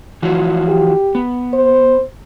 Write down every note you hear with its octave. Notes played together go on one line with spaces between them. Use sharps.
E3 F3 F#4
G4
B3
C5